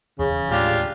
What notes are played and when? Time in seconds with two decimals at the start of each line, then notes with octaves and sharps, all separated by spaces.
0.19 D#1 E2 C#3
0.50 D#2 A2 G#3 D4 F4 G4